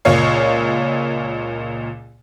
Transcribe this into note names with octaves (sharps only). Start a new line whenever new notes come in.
C#2 A#2 C#5 F5